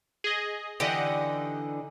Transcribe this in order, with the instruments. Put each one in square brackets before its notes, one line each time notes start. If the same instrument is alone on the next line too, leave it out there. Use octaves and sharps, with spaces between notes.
[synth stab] G#4 D#5
[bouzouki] D3 E3 D#4 [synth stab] G4 D#5 F#5